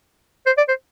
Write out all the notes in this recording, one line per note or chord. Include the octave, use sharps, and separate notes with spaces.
C5
D5
C5